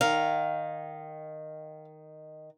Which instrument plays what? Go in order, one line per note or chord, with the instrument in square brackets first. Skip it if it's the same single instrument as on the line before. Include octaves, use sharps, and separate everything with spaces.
[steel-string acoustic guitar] D#3 [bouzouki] F5